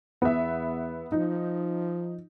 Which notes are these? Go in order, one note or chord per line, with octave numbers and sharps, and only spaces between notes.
E2 B3 E5
F3 D#4